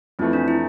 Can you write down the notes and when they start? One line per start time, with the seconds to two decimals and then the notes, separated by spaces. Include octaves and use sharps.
0.19 F2 E3 A3 C4
0.33 D4
0.48 E4